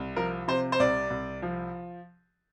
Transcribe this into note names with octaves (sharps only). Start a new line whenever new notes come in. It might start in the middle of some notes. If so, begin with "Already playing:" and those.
Already playing: C2
F3 A#4
C3 C5
C5
C2 D5
C2
F3